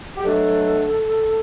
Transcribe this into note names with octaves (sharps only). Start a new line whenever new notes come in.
G4
B2 F#3 A3 D4 A4